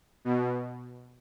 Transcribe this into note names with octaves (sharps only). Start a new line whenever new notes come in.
B2